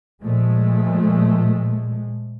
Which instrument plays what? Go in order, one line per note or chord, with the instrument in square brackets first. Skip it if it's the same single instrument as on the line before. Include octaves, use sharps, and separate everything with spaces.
[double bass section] A#2 F3 G#3 A3